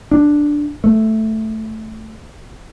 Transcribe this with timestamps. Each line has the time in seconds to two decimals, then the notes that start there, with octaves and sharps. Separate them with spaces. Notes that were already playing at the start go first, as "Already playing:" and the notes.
0.11 D4
0.84 A3